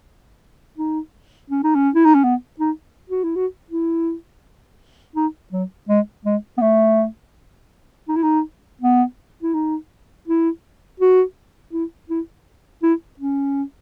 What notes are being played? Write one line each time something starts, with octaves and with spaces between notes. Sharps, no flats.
D#4
C#4
D#4
C#4
E4
D#4
C#4
B3
D#4
F#4
E4
F#4
E4
D#4
F#3
G#3
G#3
B3
A3
D#4
E4
D#4
B3
E4
D#4
E4
F#4
E4
E4
E4
C#4